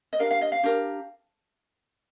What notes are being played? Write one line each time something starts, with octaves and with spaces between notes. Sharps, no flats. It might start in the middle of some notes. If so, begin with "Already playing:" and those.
D#5
D4 G4 A#4 F5
F5
D#5
F5
D4 G4 A#4